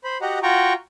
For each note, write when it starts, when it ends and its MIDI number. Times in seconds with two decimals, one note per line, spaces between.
0.04 0.18 72
0.04 0.18 83
0.21 0.39 66
0.21 0.39 67
0.21 0.39 75
0.21 0.39 78
0.21 0.39 82
0.43 0.73 65
0.43 0.73 66
0.43 0.73 79
0.43 0.73 82
0.43 0.73 85